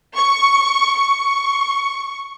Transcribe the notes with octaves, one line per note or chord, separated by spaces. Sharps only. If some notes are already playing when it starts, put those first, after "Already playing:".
C#6
C#6